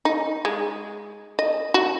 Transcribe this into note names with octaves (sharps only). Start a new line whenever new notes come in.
D#4
G#3
D#5
F#4